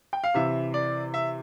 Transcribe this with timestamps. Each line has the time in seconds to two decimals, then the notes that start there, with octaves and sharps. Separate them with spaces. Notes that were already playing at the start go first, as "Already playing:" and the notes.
0.13 G5
0.24 F5
0.34 C3 E3 E5
0.74 D5
1.14 E5